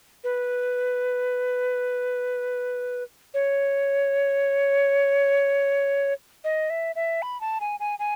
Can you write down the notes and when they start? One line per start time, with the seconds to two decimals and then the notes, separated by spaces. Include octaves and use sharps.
0.24 B4
3.34 C#5
6.44 D#5
6.70 E5
6.96 E5
7.22 B5
7.41 A5
7.61 G#5
7.80 G#5
7.99 G#5